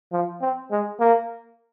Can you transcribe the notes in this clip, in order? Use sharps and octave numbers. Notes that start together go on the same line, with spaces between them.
F3
C4
G#3
A#3